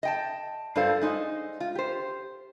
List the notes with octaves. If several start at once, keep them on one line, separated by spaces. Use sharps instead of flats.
D#5 G5 A5
G2 G3 F4 A4 C5 F5
G#3 D#4 C5
F4
G4 C5